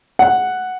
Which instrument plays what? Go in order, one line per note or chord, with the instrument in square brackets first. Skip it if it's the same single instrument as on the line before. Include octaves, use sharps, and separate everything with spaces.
[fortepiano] F#5